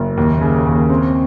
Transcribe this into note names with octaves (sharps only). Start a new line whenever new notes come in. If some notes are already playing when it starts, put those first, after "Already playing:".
Already playing: F#1
D#2
C#3
D#2
C4